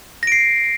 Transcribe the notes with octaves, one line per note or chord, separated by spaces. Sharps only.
A#6 C7 D7